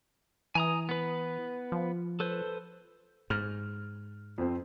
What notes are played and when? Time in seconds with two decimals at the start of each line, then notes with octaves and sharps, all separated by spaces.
0.55 E3 G#5 A#5 D#6
0.89 B3 B4
1.72 F3
2.20 A4 B4 C5
3.30 G#2 F6 F7
4.38 F2 C4